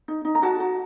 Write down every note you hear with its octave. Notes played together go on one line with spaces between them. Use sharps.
D#4
D#4
A#5
F#4 F#5 A5
F#4